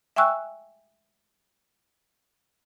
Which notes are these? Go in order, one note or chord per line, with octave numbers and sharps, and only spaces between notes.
E5 G5 G#5 C#6 E6 F#6